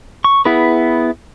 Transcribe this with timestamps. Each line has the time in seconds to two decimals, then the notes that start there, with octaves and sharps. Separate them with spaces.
0.24 C#6
0.45 B3 E4 G#4 B4